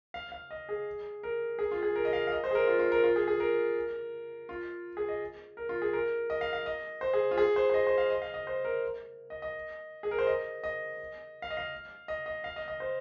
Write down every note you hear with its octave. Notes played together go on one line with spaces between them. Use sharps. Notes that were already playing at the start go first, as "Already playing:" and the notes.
F5
F5
D#5
G#4
A#4
G#4
F4
G#4
A#4
D#5
F5
F5
D#5
C5
G#4
A#4
F4
F4
A#4
F4
G#4
G#4
A#4
F4
G#4
D#5
A#4
F4
G#4
A#4
D#5
F5
F5
D#5
C5
G#4
F4
G#4
C5
C5
D#5
C5
F5
D#5
F5
D#5
C5
A#4
D#5
D#5
G#4
A#4
C5
D#5
D#5
F5
D#5
F5
D#5
D#5
F5
D#5
D#5
C5